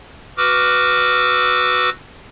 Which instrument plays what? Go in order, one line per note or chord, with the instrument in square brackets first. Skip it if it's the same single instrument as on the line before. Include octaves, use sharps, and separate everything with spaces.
[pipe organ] F#4 B4 D6 E6 F6